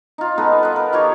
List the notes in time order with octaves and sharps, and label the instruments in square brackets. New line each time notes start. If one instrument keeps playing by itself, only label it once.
[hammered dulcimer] D#4 F4
B3 D#4 A4 B4
B4 D#5
A#4
D#3 F4 G4 C#5